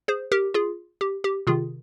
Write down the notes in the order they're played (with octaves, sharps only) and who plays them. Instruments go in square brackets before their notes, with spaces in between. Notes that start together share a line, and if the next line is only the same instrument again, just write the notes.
[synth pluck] G#4 C5
G4 A#4
F4 G#4
G4
G4
C3 D#3 F4 G#4